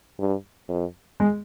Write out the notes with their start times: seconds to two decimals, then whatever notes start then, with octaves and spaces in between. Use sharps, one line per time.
0.19 G2
0.69 F2
1.20 G#3